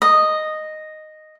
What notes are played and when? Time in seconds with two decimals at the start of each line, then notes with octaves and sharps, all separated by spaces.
0.02 D#5